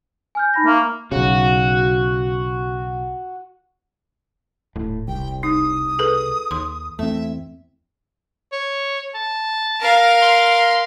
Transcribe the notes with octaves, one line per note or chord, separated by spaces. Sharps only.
G#5 F6 G6
D#4 B5 A#6
A#3 E5 C#6
B1 C#3 F#4
D#1 A2
C2 G5
D#4 D#6
G#4 A4 B4
D#2 C6
E2 A3 C4 E5
C#5
A5
A#4 F5
C6